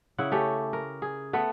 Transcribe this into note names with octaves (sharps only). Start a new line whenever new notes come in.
C#3 E4 F#5
A3 C#4 G4
A#4
G#4
A3 B3